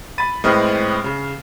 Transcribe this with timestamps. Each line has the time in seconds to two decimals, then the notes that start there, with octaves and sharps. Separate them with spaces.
0.18 B5 A6 D#7
0.44 A2 G#3 C4 B4 D#5 F6
1.04 C#3